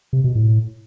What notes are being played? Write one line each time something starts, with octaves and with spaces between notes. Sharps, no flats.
C3
B2
A2